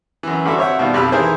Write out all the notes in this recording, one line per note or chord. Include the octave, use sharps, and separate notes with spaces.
F#2 E3
G2 D3 F#4 A4 E5
C4 C#5 E5 F#5
B2 D#3 G3 F4
B1 F2 G4 B5 E6 F6
D#3 E3 E4 G#4 A#4 C5